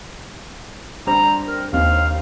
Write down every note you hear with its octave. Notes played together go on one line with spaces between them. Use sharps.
G3 C4 D4 A#5
A#4
D#2 D#3 C4 D#4 F5